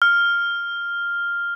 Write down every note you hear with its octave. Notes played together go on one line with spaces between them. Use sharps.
F6